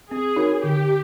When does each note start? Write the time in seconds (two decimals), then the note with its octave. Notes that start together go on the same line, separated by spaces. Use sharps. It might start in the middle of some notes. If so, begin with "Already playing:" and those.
0.11 C4 G#4
0.36 D#4 F#4 A#4 C#5
0.63 D3 G4